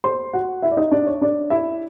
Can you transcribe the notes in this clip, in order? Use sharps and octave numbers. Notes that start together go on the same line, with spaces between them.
C5 C6
F#4 F#5
E4 E5
D5
D#4 D#5
D4 D5
C#5
D4 D5
E4 E5